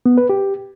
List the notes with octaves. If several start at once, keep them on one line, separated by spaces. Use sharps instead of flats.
B3
B4
G4